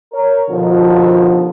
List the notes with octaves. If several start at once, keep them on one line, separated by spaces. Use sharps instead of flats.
A#4 C#5
D#2 B2 D3 F3